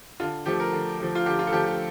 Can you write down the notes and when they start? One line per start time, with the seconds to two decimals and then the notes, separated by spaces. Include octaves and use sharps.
0.20 D3 F4
0.46 F3 A3 G4
0.60 A#4
0.73 D3
0.99 F3 A3
1.15 F4
1.26 D3 G4
1.39 F4
1.47 A4
1.52 F3 A3 G4
1.66 G4